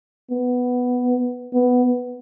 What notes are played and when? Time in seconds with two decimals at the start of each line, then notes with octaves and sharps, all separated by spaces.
0.31 B3
1.54 B3